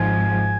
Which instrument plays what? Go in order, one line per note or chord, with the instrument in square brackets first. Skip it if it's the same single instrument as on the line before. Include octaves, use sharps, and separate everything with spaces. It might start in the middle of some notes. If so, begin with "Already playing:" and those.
Already playing: [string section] G#1 G#2 F3 [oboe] G#5